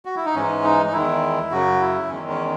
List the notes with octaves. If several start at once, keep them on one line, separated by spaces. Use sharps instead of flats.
F#4
E4
D#4
G#2 E3 G#3 C#4
D#4
D#4
E2 D#3 G#3 E4
F#2 C#3 F#3 F#4
E4
E2 D#3 G#3 C#4
C#4